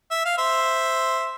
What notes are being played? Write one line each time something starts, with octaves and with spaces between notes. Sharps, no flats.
E5
F5
C5 E5